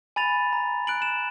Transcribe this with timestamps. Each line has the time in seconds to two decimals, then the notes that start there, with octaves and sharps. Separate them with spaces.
0.16 G#5 B5 A6 F7
0.53 A#5
0.87 F#6 D7 F#7
1.02 E7